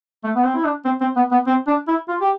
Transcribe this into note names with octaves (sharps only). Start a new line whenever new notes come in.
A3
B3
C4
E4
D4
C4
C4
B3
B3
C4
D4
E4
F4
G4